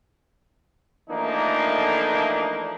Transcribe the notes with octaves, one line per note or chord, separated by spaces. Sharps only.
E3 F3 A3 A#3 D4 D#4